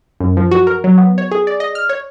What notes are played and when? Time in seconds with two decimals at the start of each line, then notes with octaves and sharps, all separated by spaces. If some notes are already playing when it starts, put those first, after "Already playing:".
0.20 F#2
0.37 F3
0.51 F#4
0.67 A#4
0.84 F#3
0.98 B3
1.18 C#5
1.31 G#4
1.47 D5
1.60 D#5
1.75 F6
1.89 C#5